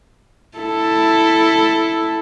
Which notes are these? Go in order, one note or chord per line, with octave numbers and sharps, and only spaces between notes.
E4 A4